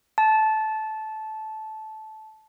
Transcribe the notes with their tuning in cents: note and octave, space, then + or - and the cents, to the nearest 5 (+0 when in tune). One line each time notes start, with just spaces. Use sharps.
A5 -15